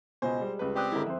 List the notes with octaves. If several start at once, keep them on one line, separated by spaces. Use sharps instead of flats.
C#2 B2 C5 D#5 G#5
G3 G#3
C#2 B4
C4 G4 D5 D#6 F#6
G#1 D3 G#3 E4 A#4
F2 C5 E5